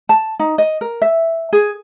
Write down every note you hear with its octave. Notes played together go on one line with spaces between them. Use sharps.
A5
D#4
D#5
A#4
E5
G#4